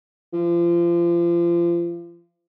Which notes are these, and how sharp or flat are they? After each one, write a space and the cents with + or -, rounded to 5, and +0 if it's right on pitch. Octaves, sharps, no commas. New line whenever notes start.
F3 -30